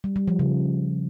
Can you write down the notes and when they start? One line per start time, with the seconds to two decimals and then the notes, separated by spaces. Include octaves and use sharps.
0.04 G3
0.16 G3
0.28 F3
0.39 C#3